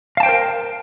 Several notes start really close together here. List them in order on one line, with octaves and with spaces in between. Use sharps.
F5 A5 G5 C5 A#4